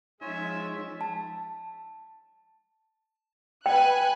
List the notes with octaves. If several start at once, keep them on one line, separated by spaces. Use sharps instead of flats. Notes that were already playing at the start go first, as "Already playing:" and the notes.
F3 G#3 C#4 D#4 F4 C#5 E5 G#5
A5
B4 G5 G#5 F#6